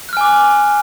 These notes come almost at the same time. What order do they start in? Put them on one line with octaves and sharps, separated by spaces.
F#6 F6 G#5 D6